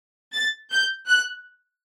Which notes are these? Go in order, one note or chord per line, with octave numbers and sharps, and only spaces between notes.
A6
G6
F#6